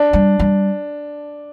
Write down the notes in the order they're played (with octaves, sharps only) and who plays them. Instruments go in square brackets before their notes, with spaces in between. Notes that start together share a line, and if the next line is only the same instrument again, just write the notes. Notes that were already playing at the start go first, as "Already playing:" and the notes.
Already playing: [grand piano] D4
[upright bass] G3
G3